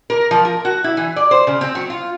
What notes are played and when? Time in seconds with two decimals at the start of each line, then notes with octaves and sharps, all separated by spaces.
0.10 A#4
0.31 F3
0.45 A#4
0.65 F#4
0.84 E4
0.97 E3
1.16 D5
1.31 C5
1.47 C#3
1.61 C4
1.75 F#3
1.90 F4